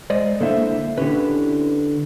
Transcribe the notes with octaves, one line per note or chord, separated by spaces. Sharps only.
G#3 C5 D5 D#5
D3 A#3 E4 A4 C5 E5
D3 C#4 E4 G4 B4